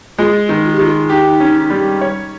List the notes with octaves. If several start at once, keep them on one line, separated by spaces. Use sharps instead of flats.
G#3 F4
D#3
F4
G4
D#3 F4
D#4 G4
C#4
G3
C#5